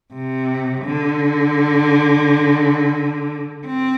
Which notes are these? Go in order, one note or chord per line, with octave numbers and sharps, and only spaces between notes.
C3
D3
C4